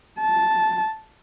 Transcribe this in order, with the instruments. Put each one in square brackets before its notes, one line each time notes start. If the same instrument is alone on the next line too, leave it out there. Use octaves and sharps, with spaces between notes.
[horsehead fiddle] A5